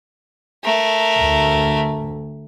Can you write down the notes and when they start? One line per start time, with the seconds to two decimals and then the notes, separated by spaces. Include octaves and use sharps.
0.64 A3 A#4
1.20 D2